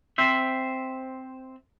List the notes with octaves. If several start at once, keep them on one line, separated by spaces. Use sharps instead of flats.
C4 C5 E5